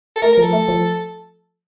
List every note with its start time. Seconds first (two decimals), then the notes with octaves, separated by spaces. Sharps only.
0.16 A4
0.22 A3 A#4
0.33 A#4
0.38 F3 A4
0.53 A3
0.68 F3